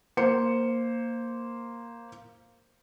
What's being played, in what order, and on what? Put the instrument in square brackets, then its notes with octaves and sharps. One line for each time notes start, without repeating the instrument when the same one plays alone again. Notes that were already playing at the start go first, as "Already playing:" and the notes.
[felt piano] A#3 C5 C#7